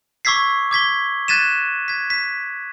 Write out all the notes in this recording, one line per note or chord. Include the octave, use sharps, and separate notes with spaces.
C#6 D6 E6 G#6 B6 C7
D6 G#6 B6 G7
F#6 G#6 A6 B6 D#7 E7
G#6 B6
B6